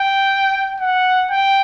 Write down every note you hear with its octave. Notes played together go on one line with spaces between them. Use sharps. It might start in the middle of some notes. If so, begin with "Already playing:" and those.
Already playing: G5
F#5
G5